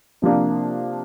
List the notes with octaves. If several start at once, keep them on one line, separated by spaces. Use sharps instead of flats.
C3 F3 A#3 D4